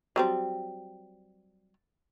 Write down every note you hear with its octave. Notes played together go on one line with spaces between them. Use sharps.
F#3 G3 C4